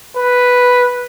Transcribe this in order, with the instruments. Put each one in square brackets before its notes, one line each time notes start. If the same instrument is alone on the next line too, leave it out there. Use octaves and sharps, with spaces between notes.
[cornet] B4